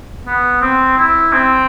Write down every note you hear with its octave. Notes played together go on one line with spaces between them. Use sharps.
B3
C4
E4
C4